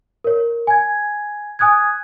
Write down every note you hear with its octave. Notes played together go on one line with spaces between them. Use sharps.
A#4 C#5
G#5 G#6
G#5 D#6 F#6 G#6